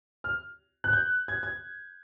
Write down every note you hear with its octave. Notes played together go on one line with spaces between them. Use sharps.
F6
F#6
G6
G#6
G#6